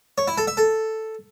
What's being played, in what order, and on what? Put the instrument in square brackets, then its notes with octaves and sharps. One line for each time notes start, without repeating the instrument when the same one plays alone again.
[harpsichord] C#5
E4
A4
E5
A4